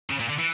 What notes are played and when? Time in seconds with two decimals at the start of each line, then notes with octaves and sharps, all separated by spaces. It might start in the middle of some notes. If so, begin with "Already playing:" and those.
0.10 C#3
0.19 A#2
0.29 D3
0.38 E3